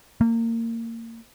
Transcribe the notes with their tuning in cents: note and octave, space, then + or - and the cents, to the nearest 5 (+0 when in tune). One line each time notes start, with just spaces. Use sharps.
A#3 -25